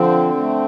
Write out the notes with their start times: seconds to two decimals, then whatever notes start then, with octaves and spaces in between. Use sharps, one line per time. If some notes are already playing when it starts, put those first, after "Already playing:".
Already playing: D3 F3 C4
0.37 A3